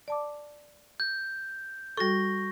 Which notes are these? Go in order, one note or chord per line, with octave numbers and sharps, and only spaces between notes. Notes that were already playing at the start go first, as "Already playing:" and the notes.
D5 A5 D6
G6
G3 F#4 A4 C#6 A#6